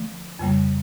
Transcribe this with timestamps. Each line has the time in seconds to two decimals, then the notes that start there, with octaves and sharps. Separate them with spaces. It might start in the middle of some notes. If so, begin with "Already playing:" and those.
Already playing: D3 F3 A3
0.39 F2 C#3 G3 A#3